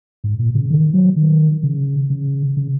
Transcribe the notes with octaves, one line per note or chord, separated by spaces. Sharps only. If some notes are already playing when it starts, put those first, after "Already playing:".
G#2
A#2
C#3
D#3
F#3
D#3
C#3
C#3
C#3